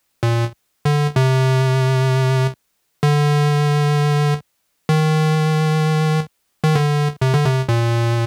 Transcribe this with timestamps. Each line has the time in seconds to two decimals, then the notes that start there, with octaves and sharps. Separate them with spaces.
0.23 A#2
0.85 D3
1.16 C3
3.03 D3
4.89 D#3
6.64 D#3
6.75 D3
7.22 C3
7.34 D3
7.45 C3
7.69 A#2